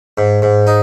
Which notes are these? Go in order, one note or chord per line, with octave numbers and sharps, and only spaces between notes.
G#2
G#2
D#4